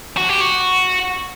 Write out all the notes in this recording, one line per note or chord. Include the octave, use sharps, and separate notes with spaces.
F#4
G4
F#4